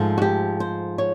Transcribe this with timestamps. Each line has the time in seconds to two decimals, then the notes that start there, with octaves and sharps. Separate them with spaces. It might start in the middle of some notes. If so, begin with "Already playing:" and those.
Already playing: G#2 F3 A3
0.18 F#4
0.22 G4
0.60 C5
0.98 C#5